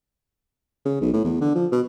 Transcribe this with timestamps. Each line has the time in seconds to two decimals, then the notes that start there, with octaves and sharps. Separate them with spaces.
0.86 C#3
1.01 B1
1.14 A2
1.25 E2
1.41 D3
1.55 F3
1.72 B2